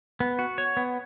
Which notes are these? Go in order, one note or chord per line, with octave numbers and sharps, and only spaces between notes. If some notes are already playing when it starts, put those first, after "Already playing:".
B3
F#4
C#5
B3